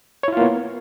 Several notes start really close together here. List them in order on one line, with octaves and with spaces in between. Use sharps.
C#5 E4 F4 A#3 B3